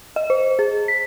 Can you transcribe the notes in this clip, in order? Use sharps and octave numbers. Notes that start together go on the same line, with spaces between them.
D#5
C5
G#4
B6